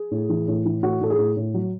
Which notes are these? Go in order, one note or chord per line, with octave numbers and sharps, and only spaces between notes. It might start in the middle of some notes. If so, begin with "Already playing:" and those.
Already playing: G#4
A2
E3
A2
E3
A2 F#4
A2 A4
G#4
A2
A2
F#3